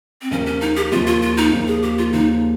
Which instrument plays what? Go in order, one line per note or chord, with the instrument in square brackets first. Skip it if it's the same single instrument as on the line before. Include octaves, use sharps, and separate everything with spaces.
[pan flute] C4
[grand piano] D#2 C#3 F3 A#3 [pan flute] C#4
[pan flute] C#4
D#4
G4
[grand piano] D#2 C#3 F3 A#3 [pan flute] F4
[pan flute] F4
F4
D#4
[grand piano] D#2 C#3 F3 A#3
[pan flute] G#4
G4
F4
[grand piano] D#2 C#3 F3 A#3 [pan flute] D#4